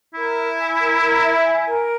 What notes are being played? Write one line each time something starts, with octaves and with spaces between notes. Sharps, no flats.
E4 A#4
E5
G#5
A#4
A#4
E5
G#5
A#4